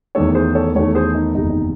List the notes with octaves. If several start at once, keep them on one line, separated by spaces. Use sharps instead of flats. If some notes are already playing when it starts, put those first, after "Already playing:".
E2 D#3 A3 A4 C#5
G#4 C5
A4 C#5
E2 D#3 A3 A4 C#5
G#4 C5
D#4
F#1 E2 C3 D#3 G#3 D#4
D#4